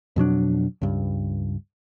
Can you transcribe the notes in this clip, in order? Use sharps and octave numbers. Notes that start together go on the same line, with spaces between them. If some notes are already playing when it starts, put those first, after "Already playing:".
F2 B2 F#3 D4
C#2 G2